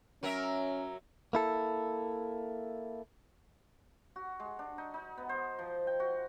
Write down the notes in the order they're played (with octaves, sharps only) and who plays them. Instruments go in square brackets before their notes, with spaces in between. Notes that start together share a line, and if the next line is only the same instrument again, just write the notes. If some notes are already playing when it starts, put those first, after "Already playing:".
[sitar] F#3 A#4 E5 [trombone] C#4
[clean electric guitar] A#3 E4 A4
[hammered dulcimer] F#4
G#3
D4
D#4
D#4
B3
C5
F3
G5
F#4